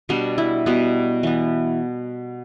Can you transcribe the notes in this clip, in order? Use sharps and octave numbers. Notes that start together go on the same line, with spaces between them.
B2 G3 B3 D4
E4
B2 G3 B3
E3 B3